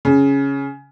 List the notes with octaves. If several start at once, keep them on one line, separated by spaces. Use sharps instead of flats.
C#3